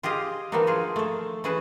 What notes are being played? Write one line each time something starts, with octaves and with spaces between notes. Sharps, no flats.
F4 G4 G#4 D#5 F5
D#3 E3 F#3 A#3 D4 D#4
F3 F4 G#4
A3 A4
E3 C#4 G#4 B4 A5